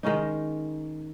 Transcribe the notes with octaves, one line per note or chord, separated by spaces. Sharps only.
D#3 G#3 C#4 D#4